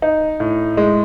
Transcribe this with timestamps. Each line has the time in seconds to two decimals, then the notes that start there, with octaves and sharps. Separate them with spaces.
0.02 D#4
0.40 A2
0.77 G#3